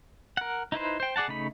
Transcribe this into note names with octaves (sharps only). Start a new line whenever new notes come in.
A#4 F#5
D#4 E4 B4 C5
C5 G5
G#4 D5 F#5 A5
C#3 A3 D#4 B5